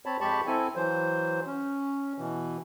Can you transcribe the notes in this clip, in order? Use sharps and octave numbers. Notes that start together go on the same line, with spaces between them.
C4 C#5 A5 B5
F2 G#3 G4 A5 B5 C#6
C4 E4 A4 G#5
E3 F#3 C5
C#4
B2 E3